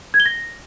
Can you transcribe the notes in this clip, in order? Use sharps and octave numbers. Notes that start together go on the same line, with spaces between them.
G#6
G7
A#6